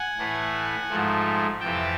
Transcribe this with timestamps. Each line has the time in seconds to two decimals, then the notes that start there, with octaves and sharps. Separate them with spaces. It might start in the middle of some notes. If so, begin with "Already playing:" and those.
Already playing: F#5 G#5
0.18 A2 E3 A3
0.89 G#2 F3 A3
1.60 F2 C3 E3 G5 A5